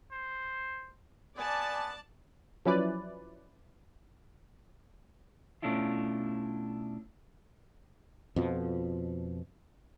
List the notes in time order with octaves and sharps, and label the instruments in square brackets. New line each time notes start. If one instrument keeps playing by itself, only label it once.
[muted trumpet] C5
[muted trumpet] B3 [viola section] D5 A5 [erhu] G#5
[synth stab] F3 F#3 C#4 E4 B4 D5
[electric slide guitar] B2 A3 C#4 D4 E4 F4
[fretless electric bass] F2 B2 F3